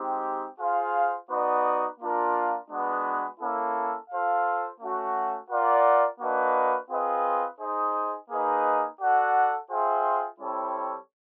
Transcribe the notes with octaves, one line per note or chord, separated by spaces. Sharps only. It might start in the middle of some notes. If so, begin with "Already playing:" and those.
Already playing: G#3 C4 D#4 G4
F4 G#4 C5 F5
B3 D#4 F#4 B4 D5
A#3 D4 F4 A#4
G#3 B3 D4 F#4 B4
A#3 C#4 E4 A4
F4 A4 C5 F5
A3 C#4 F#4
F4 A#4 D5 F#5
A#3 D4 F#4 B4 D#5
C4 F4 G#4 B4 D#5
D#4 G#4 C5 D#5
A#3 D#4 G#4 B4 D#5
F#4 A4 D5 F#5
F4 G#4 C5 E5 G5
G3 C4 E4 A4 C#5